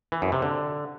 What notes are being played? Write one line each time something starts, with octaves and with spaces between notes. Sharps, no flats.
E3
F#2
C3
D3